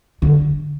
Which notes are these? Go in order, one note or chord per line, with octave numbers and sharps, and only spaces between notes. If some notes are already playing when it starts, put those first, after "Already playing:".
D3